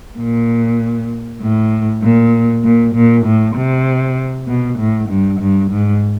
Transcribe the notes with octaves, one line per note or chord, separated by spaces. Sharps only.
A#2
A2
A#2
A#2
A#2
A2
C3
B2
A2
G2
G2
G#2